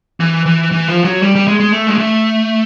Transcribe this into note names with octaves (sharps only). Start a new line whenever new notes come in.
E3
E3
E3
F3
F#3
G3
G3
G#3
G#3
A3
G#3
A3